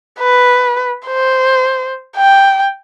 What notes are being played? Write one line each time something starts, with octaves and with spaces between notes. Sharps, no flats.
B4
C5
G5